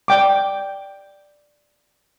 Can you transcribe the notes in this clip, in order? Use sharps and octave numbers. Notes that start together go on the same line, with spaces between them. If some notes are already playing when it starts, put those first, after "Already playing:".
D5 G5 D6